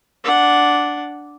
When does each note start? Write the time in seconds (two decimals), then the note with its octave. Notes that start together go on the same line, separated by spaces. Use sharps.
0.24 D4 F#5